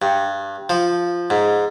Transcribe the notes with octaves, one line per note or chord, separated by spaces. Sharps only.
G2
F3
G#2